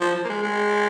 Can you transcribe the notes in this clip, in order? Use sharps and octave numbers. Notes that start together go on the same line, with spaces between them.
F3
F3
A#3
G#3
G#3